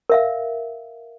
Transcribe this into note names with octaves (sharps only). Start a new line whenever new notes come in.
A#4 E5 F5